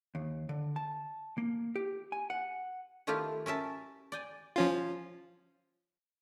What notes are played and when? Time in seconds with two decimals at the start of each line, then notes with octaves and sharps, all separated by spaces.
0.15 D#2
0.49 D3
0.76 A5
1.38 A#3
1.76 G4
2.12 G#5
2.30 F#5
3.07 D#3 A3 E4 F4 G4 F5
3.46 C#4 A#4 E5 A5
4.12 D5 G5 G#5
4.56 F3 C#4 F4